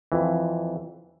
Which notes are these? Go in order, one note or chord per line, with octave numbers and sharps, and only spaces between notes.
F2 E3